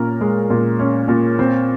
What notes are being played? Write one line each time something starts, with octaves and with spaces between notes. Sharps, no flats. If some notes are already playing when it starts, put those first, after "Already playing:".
Already playing: A#2 C#4 A#4
G#3
A#2
C#4
A#2
C4